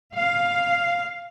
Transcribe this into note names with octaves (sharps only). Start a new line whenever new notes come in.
F5